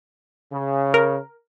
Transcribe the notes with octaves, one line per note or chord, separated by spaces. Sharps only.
C#3
A#4